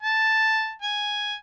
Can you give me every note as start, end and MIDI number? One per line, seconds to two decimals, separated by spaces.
0.03 0.73 81
0.82 1.36 80